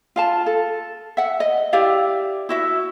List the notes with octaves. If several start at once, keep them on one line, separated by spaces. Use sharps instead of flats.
F4 F5 A5
A4
E5 F#5
D#5
E4 G4 D5 F5
E4 F#4 E5